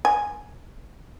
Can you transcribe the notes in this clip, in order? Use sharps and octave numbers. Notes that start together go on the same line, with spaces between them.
G#5